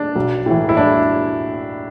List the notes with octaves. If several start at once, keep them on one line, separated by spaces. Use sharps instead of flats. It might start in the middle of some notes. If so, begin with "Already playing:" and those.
Already playing: D4
B1
A2 E3
E4
D4